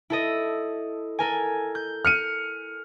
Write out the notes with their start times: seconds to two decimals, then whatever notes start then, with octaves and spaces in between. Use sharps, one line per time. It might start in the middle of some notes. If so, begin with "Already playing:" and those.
0.10 E4 A4 D#5
1.19 A4 A#4 G#5
1.75 G6
2.05 F6 C#7 D#7